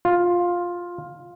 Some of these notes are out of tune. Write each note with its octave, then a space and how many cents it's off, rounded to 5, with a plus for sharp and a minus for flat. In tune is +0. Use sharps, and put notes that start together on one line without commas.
F4 +10